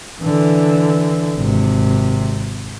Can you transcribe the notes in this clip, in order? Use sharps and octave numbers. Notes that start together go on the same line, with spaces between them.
D3 E3
G#1 C3